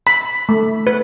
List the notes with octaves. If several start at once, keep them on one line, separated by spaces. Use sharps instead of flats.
B5
A3
B4